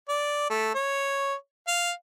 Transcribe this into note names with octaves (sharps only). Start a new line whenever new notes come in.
D5
A3
C#5
F5